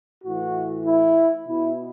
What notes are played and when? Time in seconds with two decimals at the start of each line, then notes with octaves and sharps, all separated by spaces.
0.24 A2 E3 F#4
0.86 E4
1.48 B2 E4